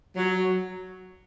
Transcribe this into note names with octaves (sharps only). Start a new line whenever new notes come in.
F#3